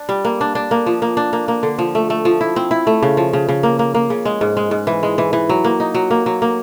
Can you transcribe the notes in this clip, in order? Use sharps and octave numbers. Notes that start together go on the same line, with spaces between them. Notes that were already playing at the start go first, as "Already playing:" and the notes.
Already playing: D4
G3
A#3
D4
D4
A#3
F3
A#3
D4
A#3
A#3
D3
F3
A3
A3
F3
E4
C4
E4
A3
C#3
F3
C#3
C#3
A#3
A#3
A#3
C#3
G#3
G#2
G#3
G#2
E3
G#3
E3
E3
F#3
A#3
D#4
F#3
A#3
F#3
A#3